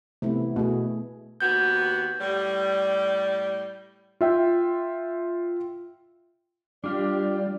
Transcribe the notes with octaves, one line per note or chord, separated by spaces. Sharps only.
C3 A3 B3 E4
B2 A3 G#4
D#2 B3 F#4 G6
A2 G3
F4 E5 G5
G3 D4 F4 G4 D5